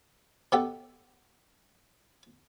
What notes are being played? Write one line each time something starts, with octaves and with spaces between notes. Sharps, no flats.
B2 G4 A4 F#5